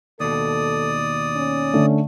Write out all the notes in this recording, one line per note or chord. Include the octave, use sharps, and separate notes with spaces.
D#2 B2 A4 D5 D#6
C#4
D3 A3